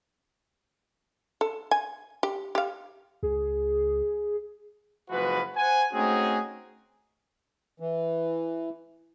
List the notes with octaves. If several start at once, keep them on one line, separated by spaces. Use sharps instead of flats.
A4
G#5
G4
G4 F5
C#2 G#4
F#1 F3 G#3 F#4 B4
C5 F#5 G#5
A3 C4 C#4 D#4 F#4 G#4
E3